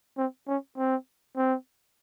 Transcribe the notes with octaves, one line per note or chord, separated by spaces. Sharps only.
C4
C#4
C4
C4